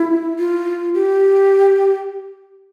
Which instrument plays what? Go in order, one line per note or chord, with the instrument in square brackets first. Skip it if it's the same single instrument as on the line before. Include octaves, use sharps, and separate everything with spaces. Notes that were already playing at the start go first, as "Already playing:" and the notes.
Already playing: [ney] E4
F4
G4